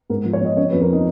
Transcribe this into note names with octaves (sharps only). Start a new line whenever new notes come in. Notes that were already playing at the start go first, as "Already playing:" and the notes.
G#2 A#4
F3
C#5
F3 D#5
C#3 C#5
B4
F2
A#4
D#4